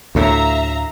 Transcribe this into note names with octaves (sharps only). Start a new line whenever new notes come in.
D2 A2 E5 F5 A#5